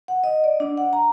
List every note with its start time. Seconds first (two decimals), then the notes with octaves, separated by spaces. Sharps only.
0.08 F#5
0.24 D#5
0.44 D5
0.60 D4
0.78 F#5
0.93 A#5